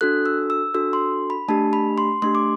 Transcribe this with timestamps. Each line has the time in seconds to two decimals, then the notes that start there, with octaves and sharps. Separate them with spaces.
0.01 D4 F#4 A4 F#6
0.26 E6
0.50 E6
0.75 D4 F#4 A4 E6
0.93 C6
1.30 B5
1.48 A3 D4 G4 A5
1.73 B5
1.98 C6
2.22 A3 D4 G4 C6
2.35 D6